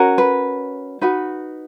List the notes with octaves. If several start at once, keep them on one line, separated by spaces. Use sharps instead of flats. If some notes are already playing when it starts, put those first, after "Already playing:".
Already playing: C#4 F#4 A#4
B4
D#4 F#4 B4